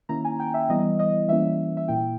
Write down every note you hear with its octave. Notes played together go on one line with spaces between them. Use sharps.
D#3 A#3 C#4 E4 A#5
G#5
G5
E5
E3 G3 B3 E4 D#5
D#5
E3 G3 A#3 C#4 E4 E5
E5
A#2 A#3 E4 G5